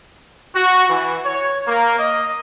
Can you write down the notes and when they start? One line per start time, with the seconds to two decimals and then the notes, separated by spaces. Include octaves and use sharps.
0.55 F#4
0.89 E3
1.24 C#5
1.66 A#3
1.98 D#5